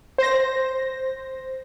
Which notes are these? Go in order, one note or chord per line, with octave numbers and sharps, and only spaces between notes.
C5 A#6